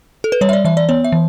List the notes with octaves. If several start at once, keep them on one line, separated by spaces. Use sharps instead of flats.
A4
B4
G3 C#5
E5
D5
E3 E5
D5
B3 C#5
E5
E3